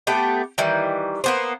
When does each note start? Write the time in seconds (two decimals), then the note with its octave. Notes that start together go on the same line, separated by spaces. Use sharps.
0.07 A3 B3 G4 G5
0.58 D#3 E3 G3
1.24 A#3 B3 C5